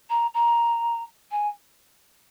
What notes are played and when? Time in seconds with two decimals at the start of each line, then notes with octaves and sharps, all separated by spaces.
0.09 A#5
0.34 A#5
1.31 G#5